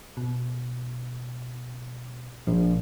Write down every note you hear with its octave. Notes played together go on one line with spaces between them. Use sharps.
B2
A#1 F3